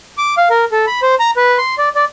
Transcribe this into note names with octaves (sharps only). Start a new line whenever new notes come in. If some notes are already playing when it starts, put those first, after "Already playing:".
D6
F5
A#4
A4
B5
C5
A#5
B4
C6
D5
D5